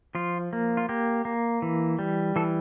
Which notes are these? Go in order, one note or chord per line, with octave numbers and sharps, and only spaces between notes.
F3 F4
A#3
F4
A#3 G4
A#3
E3
G3
E3 A4